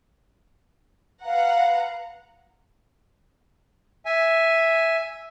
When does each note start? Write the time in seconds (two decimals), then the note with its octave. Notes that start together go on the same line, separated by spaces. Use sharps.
1.25 B4 F5 F#5 A#5
4.06 E5 G#5